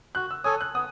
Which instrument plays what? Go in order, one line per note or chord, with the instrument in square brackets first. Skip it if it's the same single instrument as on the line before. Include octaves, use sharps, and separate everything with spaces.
[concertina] F#4 [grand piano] F#6
[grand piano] E6
[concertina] A4 C#5 G#5 [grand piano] D#6
[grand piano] F#6
[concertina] B3 [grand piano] D#6